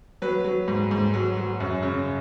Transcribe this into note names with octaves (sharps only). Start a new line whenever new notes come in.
F#3 B4
F#3
G#2
G#2
F#3
F#3
F#2
C#3